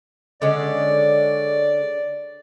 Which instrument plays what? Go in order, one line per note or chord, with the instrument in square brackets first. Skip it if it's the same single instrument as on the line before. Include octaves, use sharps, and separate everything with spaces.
[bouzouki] D3 G#3 C#4 [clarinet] D5